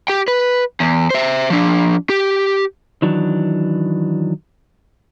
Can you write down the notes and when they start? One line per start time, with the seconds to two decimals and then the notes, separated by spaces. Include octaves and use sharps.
0.08 G4 G5
0.28 B4
0.80 E2
1.10 C5 E5
1.50 F3 D4
2.10 G4
3.02 D#3 E3 F#3 D4